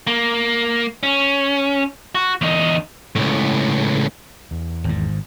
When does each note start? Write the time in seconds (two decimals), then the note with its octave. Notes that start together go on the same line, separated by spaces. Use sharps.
0.07 A#3
1.03 C#4
2.15 F#4
2.41 E2 D#4
3.16 C#2 A2
4.51 E2
4.84 G#1 G#2